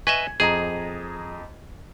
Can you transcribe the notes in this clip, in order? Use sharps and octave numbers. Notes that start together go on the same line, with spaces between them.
B4 D#5 E5 G#5 C#6 G#6
F2 G#4 D#5 A#5